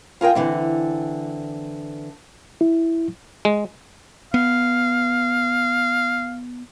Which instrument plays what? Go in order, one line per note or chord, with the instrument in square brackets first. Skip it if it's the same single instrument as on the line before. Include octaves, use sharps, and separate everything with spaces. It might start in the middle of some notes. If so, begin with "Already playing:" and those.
[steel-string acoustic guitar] F4 G#4 A#4 G5
D3 E3 C4
[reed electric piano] E4
[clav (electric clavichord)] G#3
[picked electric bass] B3 [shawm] F5